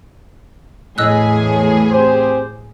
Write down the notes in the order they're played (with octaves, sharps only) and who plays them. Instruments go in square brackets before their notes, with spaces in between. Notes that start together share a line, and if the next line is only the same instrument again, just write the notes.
[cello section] E2 A2 [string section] G#4 [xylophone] D#5 E6 F#6
[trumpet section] C4 G4 C5